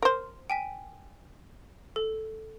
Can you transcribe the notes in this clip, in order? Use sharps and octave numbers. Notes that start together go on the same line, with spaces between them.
A#4 C5
G5 G#5 B6
A4